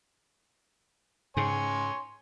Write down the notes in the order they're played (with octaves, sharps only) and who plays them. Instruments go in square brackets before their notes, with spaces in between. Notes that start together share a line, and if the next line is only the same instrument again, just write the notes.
[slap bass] G#2 C#3 [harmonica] C#5 G#5 C6